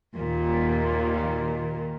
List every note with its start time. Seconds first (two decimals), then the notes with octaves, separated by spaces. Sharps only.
0.16 D#2 A#2